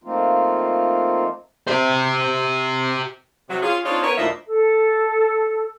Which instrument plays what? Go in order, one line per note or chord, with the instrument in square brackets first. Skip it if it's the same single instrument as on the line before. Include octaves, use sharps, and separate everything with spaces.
[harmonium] F3 A3 A#3 C4 D#4 F4
[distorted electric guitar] G4 C5
[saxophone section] C3 F#3
C#4 F4 G#4
C4 D4 D#4 F4 C#5
B3 A#4 B4 C#5
D2 A#2 F3 A#3 D#5 E5
[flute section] A4